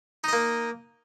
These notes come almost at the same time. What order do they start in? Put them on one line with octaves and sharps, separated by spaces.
D#4 D#5 A#3